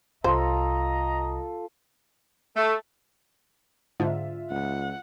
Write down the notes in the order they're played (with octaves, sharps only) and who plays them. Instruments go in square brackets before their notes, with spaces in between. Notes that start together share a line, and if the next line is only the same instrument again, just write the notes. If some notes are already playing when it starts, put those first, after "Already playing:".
[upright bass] C2 [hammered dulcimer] F4 A4 [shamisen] C5 [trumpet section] D#5 A#5
[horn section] A3
[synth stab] G#2 D3 [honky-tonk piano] F4 E5
[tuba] C#2 [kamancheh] F#5